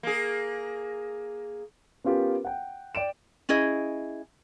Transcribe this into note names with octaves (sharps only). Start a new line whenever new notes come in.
A#3 G#4
B3 C#4 F4 G4 A#4
F#5 G5
D5 G5 D7 E7
C#4 E4 G#4 D#5